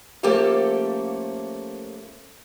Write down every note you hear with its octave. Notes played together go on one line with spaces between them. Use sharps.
F3 A3 A#3 C#4 G4 A4